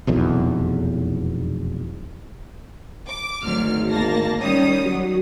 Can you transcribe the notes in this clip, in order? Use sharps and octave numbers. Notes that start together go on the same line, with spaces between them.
F1 B1 E2
D6
G#1 D2 F#3 F6
A#3 A5 A#6
D#3 G3 C#4 C#5 D#6
F#3 F#4